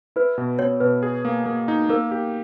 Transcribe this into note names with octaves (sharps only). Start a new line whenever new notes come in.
E4 B4
B2
B2 C#5
B2 B4
G#4
A#3
A#3
D#4
A#3 A#4
G4